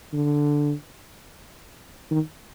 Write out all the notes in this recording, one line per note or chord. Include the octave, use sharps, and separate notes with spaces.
D3
D#3